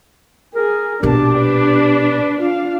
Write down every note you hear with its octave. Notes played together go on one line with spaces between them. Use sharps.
G#4 A#4
A#1 B2 A#3 D4 G4 A5
B4
F4 F5